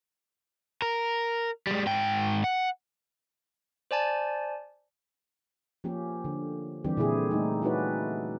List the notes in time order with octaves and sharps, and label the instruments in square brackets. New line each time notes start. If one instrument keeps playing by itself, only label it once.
[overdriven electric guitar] A#4
G3 G#3
G#2 G5
F#5
[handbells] C5 D5 G#5 A5
[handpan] F3 A#3 C#4 G4
D3
D3 E3 G3 C4 G4
A#2 D3 C4 E4 G#4
G3 A3 D#4
C#4 D#4 E4 F#4 B4 D5